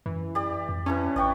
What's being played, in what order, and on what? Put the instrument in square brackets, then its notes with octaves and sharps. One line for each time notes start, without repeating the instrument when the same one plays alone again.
[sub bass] F#2 [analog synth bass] E3
[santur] G4 D5
[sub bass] F2
[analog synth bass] C#4 [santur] D4 E4 B4
[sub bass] A1 [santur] D5 G5 C#6